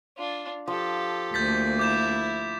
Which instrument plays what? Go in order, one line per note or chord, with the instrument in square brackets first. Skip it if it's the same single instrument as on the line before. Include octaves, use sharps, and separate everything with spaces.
[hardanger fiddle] D4 F4
[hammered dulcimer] F3 [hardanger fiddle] G4 A4
[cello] D2 A#3 [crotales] G6 A6 B6
[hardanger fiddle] E4 [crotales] D6 G6 E7